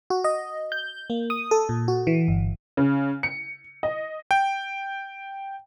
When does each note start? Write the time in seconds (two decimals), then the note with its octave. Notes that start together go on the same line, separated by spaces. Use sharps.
0.10 F#4
0.24 D#5
0.72 G6
1.10 A#3
1.30 D#6
1.51 A4
1.69 A#2
1.88 F#4
2.07 E3
2.28 G1
2.77 C#3
3.23 C#7
3.83 D#5
4.31 G5